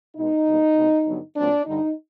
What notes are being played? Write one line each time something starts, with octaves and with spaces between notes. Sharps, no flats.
B2 G#3 B3 D#4
B2 G3 A#3
B2 G#3 C4
G2 D3 F#3 B3
A#2 F#3 A3 C4 D4
G2 D3 G3 D#4